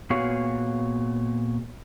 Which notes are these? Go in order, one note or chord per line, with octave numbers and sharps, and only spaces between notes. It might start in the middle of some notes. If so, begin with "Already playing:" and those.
A#2 B3 F#4 G#4 C#5 F5